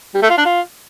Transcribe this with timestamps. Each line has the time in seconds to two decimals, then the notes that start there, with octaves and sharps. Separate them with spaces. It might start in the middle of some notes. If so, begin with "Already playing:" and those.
0.15 G3
0.22 A3
0.30 F4
0.38 D4
0.45 F4